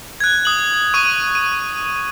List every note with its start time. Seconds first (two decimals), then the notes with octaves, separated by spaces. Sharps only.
0.20 F#6 G#6
0.45 D#6 F#7
0.94 C#6 D#6 D#7
1.35 D#7